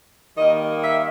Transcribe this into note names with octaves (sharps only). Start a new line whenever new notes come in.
D#3 G3 A#3 D#5
E5